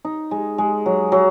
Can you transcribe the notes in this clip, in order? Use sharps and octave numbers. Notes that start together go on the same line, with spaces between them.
D#4
G#3
G#3
F#3
F#3